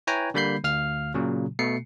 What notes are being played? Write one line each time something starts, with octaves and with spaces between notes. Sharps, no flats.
E4 B4 C#5 G5 G#5 A#5
D3 G3 A#3 B5 G6 C7
D2 F5 F6
A#2 C#3 F#3
B2 A3 C7 C#7